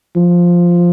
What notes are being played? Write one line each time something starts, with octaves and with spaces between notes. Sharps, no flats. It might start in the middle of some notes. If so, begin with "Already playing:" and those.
F3